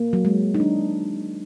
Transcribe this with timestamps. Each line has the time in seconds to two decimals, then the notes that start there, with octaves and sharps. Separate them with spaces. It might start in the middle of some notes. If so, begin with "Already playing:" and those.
Already playing: A#3
0.13 F#3
0.25 G#3
0.55 D#4
0.60 D4